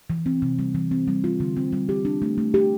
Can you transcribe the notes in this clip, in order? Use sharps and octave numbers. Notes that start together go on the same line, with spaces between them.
E3
C4
C3
G3
E3
C4
G3
F4
D3
C4
G3
G4
D4
A3
A3
G4